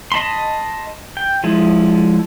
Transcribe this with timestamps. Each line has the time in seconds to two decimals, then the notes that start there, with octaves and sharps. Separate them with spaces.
0.12 D#5 A5 B5 C6
1.17 G5
1.44 F3 G#3 E4